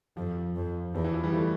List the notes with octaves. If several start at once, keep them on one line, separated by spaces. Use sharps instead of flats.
F2 F3
F2
E2 F3
E3
F3
E3 G3
F3 A3